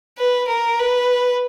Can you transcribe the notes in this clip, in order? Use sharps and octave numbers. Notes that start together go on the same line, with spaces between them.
B4
A#4
B4